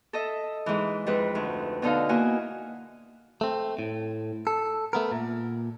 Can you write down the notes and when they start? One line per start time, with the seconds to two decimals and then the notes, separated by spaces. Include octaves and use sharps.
0.13 A4 D#5 E5
0.66 G#2 E3
1.07 F2 G#2 B4
1.35 D2
1.82 B2 D3 D#4 F5
2.09 A#3 E4 F#4 D#5 G#5
3.41 A3 C4
3.79 A2
4.47 A4
4.93 A3 B3 A#4
5.12 A#2